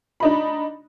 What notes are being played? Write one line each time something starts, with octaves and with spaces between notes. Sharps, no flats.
D4 D#4 B5